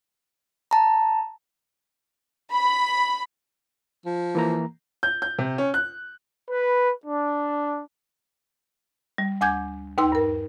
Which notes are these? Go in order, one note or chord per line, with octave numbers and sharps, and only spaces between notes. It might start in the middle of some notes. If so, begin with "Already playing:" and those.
A5 A#5
B5
F3
E3 A#3 A#5
G6
G6
C3
C#4
F#6
B4
D4
G3
D2 G#5 D6 G6 G#6
D#2 D#4 B4 G5 C6 E6
G2 A#4